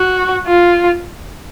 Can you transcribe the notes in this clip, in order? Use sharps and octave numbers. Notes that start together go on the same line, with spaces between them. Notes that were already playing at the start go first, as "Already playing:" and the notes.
Already playing: F#4
F4